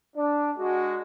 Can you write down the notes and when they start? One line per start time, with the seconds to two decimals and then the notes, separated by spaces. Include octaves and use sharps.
0.16 D4
0.58 G#3 F#4